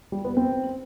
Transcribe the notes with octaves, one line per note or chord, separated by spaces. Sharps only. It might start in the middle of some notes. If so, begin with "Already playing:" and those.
G3
B3
C4